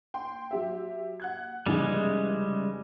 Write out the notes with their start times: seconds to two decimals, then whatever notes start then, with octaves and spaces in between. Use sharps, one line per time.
0.14 G5 C6
0.51 F#3 G4 E5
1.20 F#5 F#6 G#6
1.66 F1 C#3 E3 G3 G#3